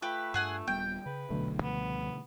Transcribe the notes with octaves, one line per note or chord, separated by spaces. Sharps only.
A3 F4 G4 B4
G2 G#4 F#5 G#5
D#1 G3 B3 G5
C#3 B4
D#1 B1 B2 D3 F#3 A3
C#2 F3 G3 B3